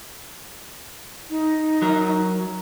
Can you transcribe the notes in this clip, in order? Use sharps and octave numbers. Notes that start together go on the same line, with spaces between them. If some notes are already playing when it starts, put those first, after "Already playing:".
D#4
F#3 A#4